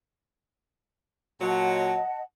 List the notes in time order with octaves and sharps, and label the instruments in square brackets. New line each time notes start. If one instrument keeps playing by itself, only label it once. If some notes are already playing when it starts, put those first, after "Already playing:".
[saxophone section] A#2 F#3 [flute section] D#5 F#5 A5